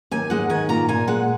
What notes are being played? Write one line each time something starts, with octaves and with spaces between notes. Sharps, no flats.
D#2 G#5
G#3 F#5
D#3 G#5
A#2 A#5
A#2 G#5
G#3 F#5